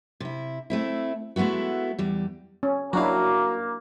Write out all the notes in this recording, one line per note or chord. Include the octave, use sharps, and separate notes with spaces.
C3 E4
A3 C4 E4
G#3 A3 B3 E4 F#4
E2 G3
C#4
F#3 A#3 D4 E4 F#4 F5